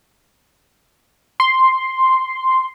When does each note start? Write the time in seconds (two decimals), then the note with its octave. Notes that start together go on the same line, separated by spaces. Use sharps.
1.40 C6